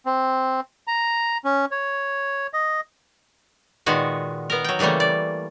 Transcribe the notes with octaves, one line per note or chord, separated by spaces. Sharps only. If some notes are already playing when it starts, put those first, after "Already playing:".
C4
A#5
C#4
C#5
D#5
A#2 D#3 G#3 B3 F#4
B3 A#4
F#3 G5
C#3 E3 G3 A3 A#3
D5